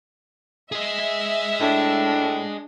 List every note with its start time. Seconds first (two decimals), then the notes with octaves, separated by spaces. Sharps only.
0.72 G#4 D#5 E5
1.60 A2 D4